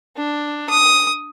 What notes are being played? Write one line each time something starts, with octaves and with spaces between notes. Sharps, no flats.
D4
D#6